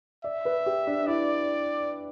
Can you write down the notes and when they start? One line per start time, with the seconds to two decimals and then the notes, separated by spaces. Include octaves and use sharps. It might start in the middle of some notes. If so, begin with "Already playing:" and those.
0.24 D5 E5
0.45 B4
0.66 G4
0.87 D4
1.07 E4 D5